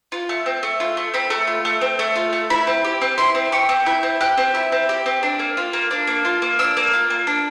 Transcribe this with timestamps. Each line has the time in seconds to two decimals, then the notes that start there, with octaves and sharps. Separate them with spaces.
0.12 F4
0.29 A3
0.46 C4
0.63 A3
0.80 F4
0.97 A3
1.14 C4 B5
1.30 A3
1.47 F4
1.65 A3
1.81 C4
1.99 A3
2.16 F4
2.33 A3
2.50 E4 B5
2.67 C4
2.84 G4
3.01 C4
3.18 E4 C6
3.35 C4
3.52 G4 C#6
3.69 C4
3.86 E4 G6
4.03 C4
4.21 G4 F#6
4.38 C4
4.55 E4
4.72 C4
4.89 G4
5.06 C4
5.23 D4
5.39 A#3
5.57 F4
5.73 A#3
5.91 D4
6.07 A#3
6.25 F4
6.42 A#3
6.59 D4 E6
6.77 A#3
6.93 F4
7.10 A#3
7.27 D4